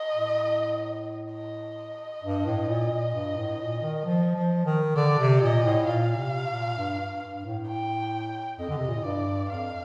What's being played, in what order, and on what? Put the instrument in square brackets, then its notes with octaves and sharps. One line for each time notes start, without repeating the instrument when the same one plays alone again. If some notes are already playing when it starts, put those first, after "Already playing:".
Already playing: [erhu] D#5
[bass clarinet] A2
[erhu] D#5
[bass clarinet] G2
A2
A#2
A#2
G2
A2
A#2
D#3
F3
F3
D#3
[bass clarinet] D3 [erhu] D5
[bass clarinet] C3
[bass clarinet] A#2 [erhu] D#5
[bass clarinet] A2
[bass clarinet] A#2 [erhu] F5
[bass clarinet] C3
A#2
G2
G2
G2
A2
[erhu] G5
[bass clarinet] F2 [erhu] D#5
[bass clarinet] D3
C3
A#2
A2
[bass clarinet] G2 [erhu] D5
[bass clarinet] F2 [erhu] F5